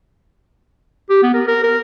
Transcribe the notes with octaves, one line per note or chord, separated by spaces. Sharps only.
G4
B3
A#4
A#4
A#4